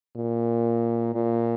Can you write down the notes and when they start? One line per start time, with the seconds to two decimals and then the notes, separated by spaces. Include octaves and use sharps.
0.16 A#2
1.15 A#2